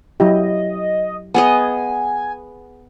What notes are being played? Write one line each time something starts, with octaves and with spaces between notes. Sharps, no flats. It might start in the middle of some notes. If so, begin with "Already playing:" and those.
F#3 E4 G4 D#5
B3 G#4 D#5 G#5